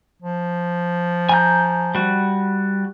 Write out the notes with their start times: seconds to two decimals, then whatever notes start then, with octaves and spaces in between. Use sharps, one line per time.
0.22 F3
1.29 G#5 A#5 G6
1.95 G3 F#4